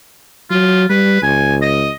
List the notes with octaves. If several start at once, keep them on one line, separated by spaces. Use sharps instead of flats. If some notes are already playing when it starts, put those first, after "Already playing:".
F#3 F4
G3 B4
C#2 G#5
D#5